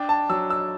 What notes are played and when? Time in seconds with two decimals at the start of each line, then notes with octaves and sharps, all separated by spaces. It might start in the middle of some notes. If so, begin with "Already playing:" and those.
Already playing: D4 G5
0.09 A5
0.30 F#3 E6
0.50 E6